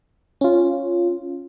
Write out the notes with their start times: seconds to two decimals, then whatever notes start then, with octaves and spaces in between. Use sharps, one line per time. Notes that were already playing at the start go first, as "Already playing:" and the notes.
0.41 C#4 F4